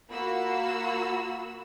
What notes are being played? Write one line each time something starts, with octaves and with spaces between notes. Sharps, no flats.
A#3 F4 F#4 B5 E6